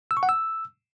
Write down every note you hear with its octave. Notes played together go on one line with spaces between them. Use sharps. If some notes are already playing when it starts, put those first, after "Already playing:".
E6
C#6
F#5
E6